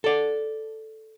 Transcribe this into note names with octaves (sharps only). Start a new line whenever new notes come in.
A4 D5